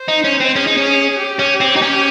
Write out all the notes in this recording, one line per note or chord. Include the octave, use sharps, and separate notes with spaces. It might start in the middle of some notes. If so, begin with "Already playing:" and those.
Already playing: C5
D#4
C#4
C4
C#4 G#4
D#4
C#4
G4
C#4
C4
D#4
C#4